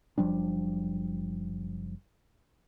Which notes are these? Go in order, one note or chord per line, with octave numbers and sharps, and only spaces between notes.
F#1 F3 G3 D4